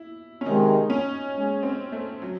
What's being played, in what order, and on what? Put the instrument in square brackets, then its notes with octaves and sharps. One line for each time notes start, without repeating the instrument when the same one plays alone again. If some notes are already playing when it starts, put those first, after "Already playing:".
Already playing: [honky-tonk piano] E4
C#4
[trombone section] C3 D#3 G#3 [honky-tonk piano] D#4
[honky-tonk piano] C#4
[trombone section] G#3 C#4 G#4
[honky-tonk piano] C4
A3
F#3